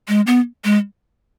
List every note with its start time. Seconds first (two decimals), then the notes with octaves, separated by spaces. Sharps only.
0.08 G#3
0.27 B3
0.64 G#3